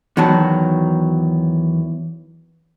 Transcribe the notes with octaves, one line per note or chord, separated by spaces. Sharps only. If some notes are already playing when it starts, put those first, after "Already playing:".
E2 D#3 F#3 F#4 A5